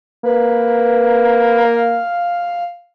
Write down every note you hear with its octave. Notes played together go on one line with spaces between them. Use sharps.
A#3 B4
F5